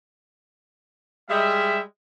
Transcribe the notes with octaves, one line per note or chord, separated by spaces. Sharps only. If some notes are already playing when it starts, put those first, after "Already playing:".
G3 G#3 E5